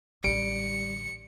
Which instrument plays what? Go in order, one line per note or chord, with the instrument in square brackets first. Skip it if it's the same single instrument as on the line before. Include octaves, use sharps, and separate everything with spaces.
[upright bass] A1 D3 [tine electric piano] G3 [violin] C#7 [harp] D7